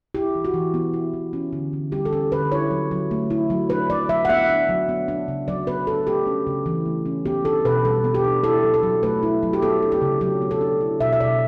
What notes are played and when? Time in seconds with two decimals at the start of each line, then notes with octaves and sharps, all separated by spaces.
0.15 E4 G4
0.35 E3
0.45 F#4
0.54 E3
0.74 B3
0.94 E4
1.14 E3
1.33 C#4
1.53 D3
1.73 D3
1.92 G3 G4
2.05 A4
2.13 C#4 G4
2.32 D3 B4
2.52 E4 C#5
2.71 F#3
2.91 F#3
3.11 A3
3.30 E4
3.50 F#3
3.70 D4 B4
3.90 F#3 D5
4.09 F#3 E5
4.25 F#5
4.29 B3 E5
4.49 D4
4.69 F#3
4.89 B3
5.08 D4
5.28 C#3
5.48 F#3 D5
5.67 B3 B4
5.87 D4 A4
6.07 A3 G4
6.27 C#4
6.47 C#3
6.66 E3
6.86 A3
7.06 C#4
7.26 B3 G4
7.45 D4 A4
7.65 B2 B4
7.85 G3 A4
8.04 B3
8.14 G4
8.24 D4
8.44 E4 A4
8.64 F#3
8.74 A4
8.83 F#3
9.03 A3 B4
9.23 E4
9.43 F#3
9.53 G4
9.62 B3 A4
9.82 D4
9.92 G4
10.02 C#3
10.21 F#3 G4
10.42 B3
10.51 A4
10.61 D4
10.81 E4
11.00 B2 E5
11.13 E5
11.20 B2 D5